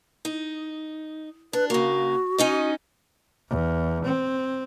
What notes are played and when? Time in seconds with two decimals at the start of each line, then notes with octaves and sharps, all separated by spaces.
0.25 D#4
1.53 D4 B4
1.70 C#3 A#3 F#4
2.38 C#4 D#4 D#5
3.49 E2
4.05 C4